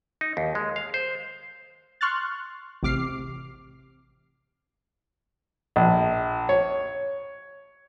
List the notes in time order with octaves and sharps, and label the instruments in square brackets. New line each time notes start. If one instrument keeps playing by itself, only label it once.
[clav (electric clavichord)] D#4
D#2
G#3
F5
C5
[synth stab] C6 C#6 F6 F#6 A6
A1 C3 D6 F6 C7
[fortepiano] A#1
C#5